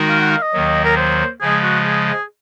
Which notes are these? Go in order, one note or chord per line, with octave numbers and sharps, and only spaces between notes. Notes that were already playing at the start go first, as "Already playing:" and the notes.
Already playing: D#3 G#3 D#4 F#4 A#4
F5
F#5
F5
D#5
D#2 D#3 F#3
A#4
C5
C#3 F3 G#3 G#4
F#4
G#4
G#4